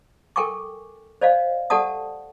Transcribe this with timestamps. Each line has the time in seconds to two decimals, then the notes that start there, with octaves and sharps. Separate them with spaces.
0.36 A4 A#4 G5 G#5 C#6 D6
1.21 C5 D5 D#5 F5
1.70 G4 A4 D5 F#5 A5 D#6